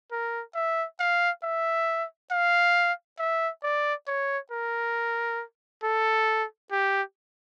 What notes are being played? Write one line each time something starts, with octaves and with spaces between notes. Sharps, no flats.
A#4
E5
F5
E5
F5
E5
D5
C#5
A#4
A4
G4